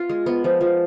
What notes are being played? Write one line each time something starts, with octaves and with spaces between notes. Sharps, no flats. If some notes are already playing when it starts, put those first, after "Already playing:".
Already playing: B3 F4
G#3
B3
F3
F3